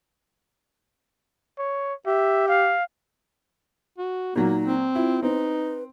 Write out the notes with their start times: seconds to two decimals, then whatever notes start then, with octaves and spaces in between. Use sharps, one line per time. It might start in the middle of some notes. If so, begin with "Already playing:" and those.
1.58 C#5
2.07 G4 E5
2.48 F5
3.98 F#4
4.36 A#2 F#3 A#3 D#4
4.65 C4
4.95 E4 F4
5.23 C4 D#4 B4